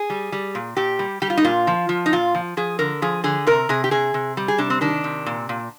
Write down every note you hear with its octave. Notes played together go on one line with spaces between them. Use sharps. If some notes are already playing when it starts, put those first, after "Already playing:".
Already playing: G#4
G3
G3
A#2
A#2 G4
G3
G3 G4
F4
D#4
A#2 F4
F3
F3
D#4
A#2 F4
F3
F3 G#4
D3 A#4
F3 G#4
D3 G#4
C3 A#4
C3 G#4
G4
C3 G#4
C3
G3
G#4
C3 D4
C4
D#3 D4
C3
A#2
A#2